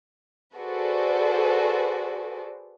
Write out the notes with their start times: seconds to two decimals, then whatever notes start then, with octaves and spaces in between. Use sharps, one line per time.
0.56 F#4 G#4 A4 B4 C5 D5